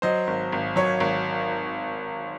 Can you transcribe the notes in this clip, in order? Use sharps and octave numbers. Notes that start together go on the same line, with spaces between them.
F#3 C5 D#5
G#1
G#1
F#3 C#5
G#1